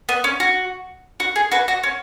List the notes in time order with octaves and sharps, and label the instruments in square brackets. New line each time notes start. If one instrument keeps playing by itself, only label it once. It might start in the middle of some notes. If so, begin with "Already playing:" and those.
[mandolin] B3
C#4
F#4
F#4
G#4
F#4 B4
F#4
C#4